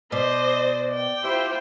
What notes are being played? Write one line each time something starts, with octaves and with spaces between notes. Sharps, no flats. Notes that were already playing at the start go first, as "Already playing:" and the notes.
B2 C5 D5 D#5
G5
E4 F4 G4 C5 E5